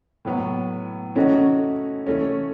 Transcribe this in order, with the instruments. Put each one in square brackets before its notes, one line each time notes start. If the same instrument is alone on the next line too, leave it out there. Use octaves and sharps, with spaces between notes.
[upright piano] A2 F#3 B3
[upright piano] E3 A3 D#4 F#4 [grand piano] C#4
[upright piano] E3 A3 C#4